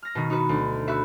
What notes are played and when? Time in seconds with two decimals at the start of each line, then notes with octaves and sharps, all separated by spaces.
0.02 F6 A#6
0.15 B2 D#3
0.30 D#4 F#4 B4
0.49 D2
0.88 F#4 B4 E5